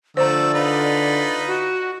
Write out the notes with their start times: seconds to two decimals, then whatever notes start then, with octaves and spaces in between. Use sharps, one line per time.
0.17 D3 F3 A3 C5 D5 A#5 E6
0.54 D#4 F4 B4
1.47 F#4